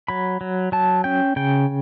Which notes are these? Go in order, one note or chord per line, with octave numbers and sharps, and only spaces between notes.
F#3 B5
F#3
F#3 A5
C#4 G5
C#3 G5